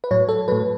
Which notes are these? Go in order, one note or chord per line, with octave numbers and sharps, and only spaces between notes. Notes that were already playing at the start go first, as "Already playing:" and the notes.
B4
A2 F#3 C#5
A4
A2 F#3 B4